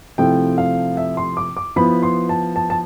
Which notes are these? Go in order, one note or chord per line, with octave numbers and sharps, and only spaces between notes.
C3 F3 A3 E4 G5
F5
E5
C6
D6
D6
F3 B3 E4 B5
C6
A5
A5
A5